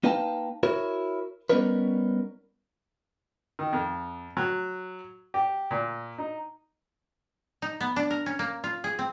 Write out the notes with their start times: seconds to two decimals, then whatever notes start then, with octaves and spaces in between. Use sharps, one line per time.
0.03 A#3 D#4 B4 F5 G5 A5
0.63 E4 F#4 A#4 C#5
1.50 G3 B3 C#4 D#4 A#4 B4
3.59 D#3
3.73 F2
4.37 F#3
5.34 G4
5.71 A#2
6.18 D#4
7.62 D#4
7.81 B3
7.96 D4
8.10 A#4
8.26 C#4
8.39 A#3
8.64 F4
8.84 G#4
8.99 C4